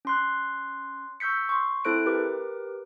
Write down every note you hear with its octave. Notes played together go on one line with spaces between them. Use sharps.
C#4 C6 F#6
C#6 E6 G6 B6 C#7
C6 C#6
C4 E4 A4 C5 F#6 D7
G4 A#4 B4 D6